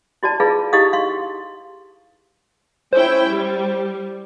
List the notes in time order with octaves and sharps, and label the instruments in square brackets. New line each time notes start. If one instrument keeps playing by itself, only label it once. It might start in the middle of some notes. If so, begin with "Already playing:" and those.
[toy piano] E4 F#4 D5 A5
E4 F4 G#4 B4 F5
D#4 E4 G4 D#5 F5 D#6
F5 C6
[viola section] C#4 E4 G5 [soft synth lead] C5
[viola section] G3